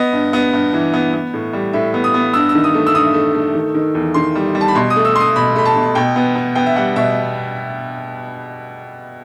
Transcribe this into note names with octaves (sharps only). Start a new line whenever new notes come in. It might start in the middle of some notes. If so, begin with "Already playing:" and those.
Already playing: B3 D#5
G2
B3
G2
E3
B3
B3
A2
G3
A2 E5
B3
D#6
B3
G2 E6
E6
D#3
D#6
A3
E6
G2 D#6
A3
A3
D#3
D#3
E2
D#3 C6
G3
G3
A5
B5
B2 C6
D#6
A3
E6
A3 C6 D#6
B2 B5
A3 B5
A5
B2
B2 G5
B3
B3
B3 G5
E5
G3 F#5
B2 E5